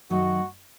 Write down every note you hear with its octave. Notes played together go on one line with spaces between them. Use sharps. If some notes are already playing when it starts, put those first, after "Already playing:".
F#2 D#3 F#3 A3 F#4